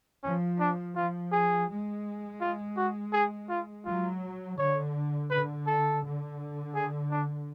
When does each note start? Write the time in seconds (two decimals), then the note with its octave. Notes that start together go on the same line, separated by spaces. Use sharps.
0.23 F3 C#4
0.60 D4
0.96 F3 F4
1.32 G#4
1.68 G#3
2.41 F4
2.77 F#4
3.13 G#4
3.49 F4
3.86 F#3 F4
4.58 D3 C#5
5.30 D3 B4
5.67 A4
6.03 D3
6.75 G#4
7.11 D4